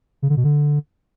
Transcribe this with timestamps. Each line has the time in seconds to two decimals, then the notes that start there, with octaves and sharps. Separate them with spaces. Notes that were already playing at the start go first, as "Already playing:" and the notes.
0.22 C#3
0.30 D3
0.37 B2
0.44 D3